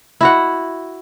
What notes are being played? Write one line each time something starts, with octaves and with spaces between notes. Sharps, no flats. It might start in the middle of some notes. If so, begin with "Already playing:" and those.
E4 F#4 F#5